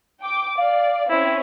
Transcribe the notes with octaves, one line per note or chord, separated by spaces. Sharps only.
G5 D6
D5 F5
C4 C#4 E4